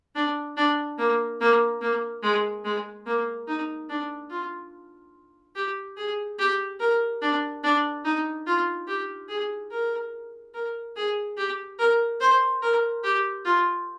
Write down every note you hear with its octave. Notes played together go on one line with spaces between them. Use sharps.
D4
D4
A#3
A#3
A#3
G#3
G#3
A#3
D#4
D4
F4
G4
G#4
G4
A#4
D4
D4
D#4
F4
G4
G#4
A#4
A#4
G#4
G4
A#4
C5
A#4
G4
F4